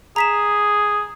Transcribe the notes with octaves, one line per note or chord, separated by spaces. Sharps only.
G#4 A#5 B6 E7